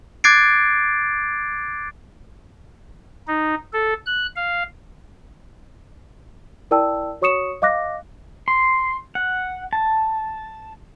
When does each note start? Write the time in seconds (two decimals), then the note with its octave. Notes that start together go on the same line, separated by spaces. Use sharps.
0.24 D6 F#6 G#6 A6 C7 D7
3.28 D#4
3.73 A4
4.06 F#6
4.36 F5
6.71 E4 A#4 D5 G5 A5 E6
7.21 F#4 C#5 C#6 D#6 C#7 E7
7.62 D#5 F5 D6 F#6 A#6
8.48 C6
9.15 F#5
9.73 A5